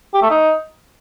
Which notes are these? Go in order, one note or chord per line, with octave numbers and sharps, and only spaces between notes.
G4
A3
D#4